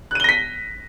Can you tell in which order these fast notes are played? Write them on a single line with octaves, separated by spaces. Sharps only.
F#6 D#7 G7 A#6 B6